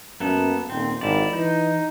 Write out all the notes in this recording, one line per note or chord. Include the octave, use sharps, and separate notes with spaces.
F#2 A#3 B3 A4
D#1 C4
G#1 E4 D5
E3 D#4